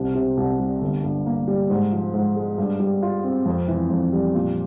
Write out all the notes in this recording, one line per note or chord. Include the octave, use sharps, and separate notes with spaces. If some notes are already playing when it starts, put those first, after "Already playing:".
Already playing: C2 C3
C3
C2
G3
G1
G2
A#3
G3
G#2
F3
G#2
G#3
G2
G3
F4
C4
F2
E3
F2
G3
A#2